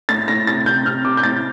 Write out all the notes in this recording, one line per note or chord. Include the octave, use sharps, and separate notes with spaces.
A2 A6
A2 A#6
C3 A6
C3 G6
C3 F6
C3 D6
G6
A2 A6